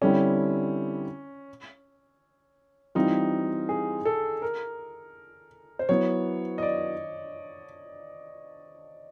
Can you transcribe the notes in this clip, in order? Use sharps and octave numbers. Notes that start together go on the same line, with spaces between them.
D3 G3 C4 C#4 E4
E3 G3 C4 D#4 F4
G#4
A4
A#4
C5
F#3 B3 E4 C#5
D#5
D5